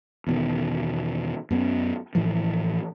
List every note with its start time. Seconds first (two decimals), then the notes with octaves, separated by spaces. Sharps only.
0.27 E2 B2 D#3
1.50 F#2 B3 C#4
2.15 A1 A2 E3 F3